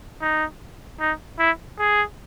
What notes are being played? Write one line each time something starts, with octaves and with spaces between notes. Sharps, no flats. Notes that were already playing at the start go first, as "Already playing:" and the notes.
D#4
D#4
E4
G#4